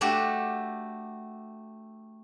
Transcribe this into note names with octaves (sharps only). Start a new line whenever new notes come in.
A3 D4 F#4 G4 A4